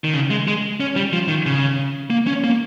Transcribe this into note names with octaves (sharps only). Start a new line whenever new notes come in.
D#3
C#3
G#3
G#3
C#4
G3
F3
D#3
C#3
A#3
C#4
A#3